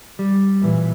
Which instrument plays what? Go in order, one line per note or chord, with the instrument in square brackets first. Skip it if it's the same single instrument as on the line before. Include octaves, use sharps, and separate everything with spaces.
[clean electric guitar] G3
[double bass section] A#2 E3